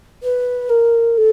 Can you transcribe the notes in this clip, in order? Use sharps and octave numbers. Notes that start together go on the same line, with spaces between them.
B4
A#4
A4